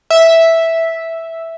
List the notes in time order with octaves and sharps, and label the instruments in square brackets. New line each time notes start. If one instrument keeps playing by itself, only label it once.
[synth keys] E5